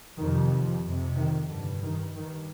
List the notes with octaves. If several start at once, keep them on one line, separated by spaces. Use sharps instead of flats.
F2 C3 D#3
F3
F2 C3
D#3
G2 D3
D#3
G2 D#3